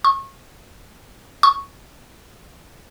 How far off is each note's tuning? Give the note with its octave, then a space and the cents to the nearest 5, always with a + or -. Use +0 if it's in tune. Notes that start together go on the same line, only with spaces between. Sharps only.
C#6 -30
C#6 +0